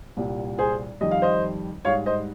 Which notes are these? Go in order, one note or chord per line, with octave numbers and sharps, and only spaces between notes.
C2 A#2 G3
G#4 C5
F2 D#3 G3 D#5
F5
C5 D#5
G#2 G3 C#5 F5
C5 D#5